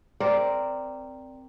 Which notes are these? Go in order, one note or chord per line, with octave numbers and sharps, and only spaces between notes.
C4 A#4 D5